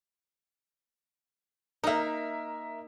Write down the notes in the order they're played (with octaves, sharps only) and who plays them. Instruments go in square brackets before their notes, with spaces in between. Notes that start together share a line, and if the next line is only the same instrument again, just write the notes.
[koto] A#3 D#4 [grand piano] A#4 E5